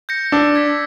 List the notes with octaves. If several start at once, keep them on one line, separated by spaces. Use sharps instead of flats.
G6 A#6 C#7
D4 E6
G#6 B6